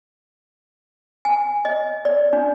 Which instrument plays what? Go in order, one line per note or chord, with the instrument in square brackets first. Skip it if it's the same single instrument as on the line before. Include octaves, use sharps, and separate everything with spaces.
[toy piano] G#5
D#5
D5
D4